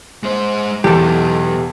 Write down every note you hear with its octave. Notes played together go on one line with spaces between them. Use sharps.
G#3 C5
B1 E2 G4 A4